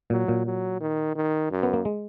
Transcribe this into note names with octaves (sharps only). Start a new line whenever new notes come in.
A#2 F#3
A#2
F#3
D#3
D#3
F#2
B3
A#3
G#3